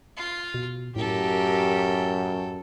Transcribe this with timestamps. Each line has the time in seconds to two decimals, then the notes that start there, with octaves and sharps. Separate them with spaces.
0.17 F4 F5
0.54 B2
0.96 F#2 A2 G4 A4 A#4 G5